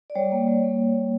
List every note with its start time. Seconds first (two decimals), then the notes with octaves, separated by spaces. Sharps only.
0.10 D5
0.15 G3 C#5
0.32 A#3
0.48 G3
0.64 A#3